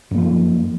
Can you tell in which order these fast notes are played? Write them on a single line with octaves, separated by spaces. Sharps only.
F#2 A#3 F3